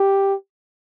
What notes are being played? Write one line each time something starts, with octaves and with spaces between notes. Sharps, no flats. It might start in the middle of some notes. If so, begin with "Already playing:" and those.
Already playing: G4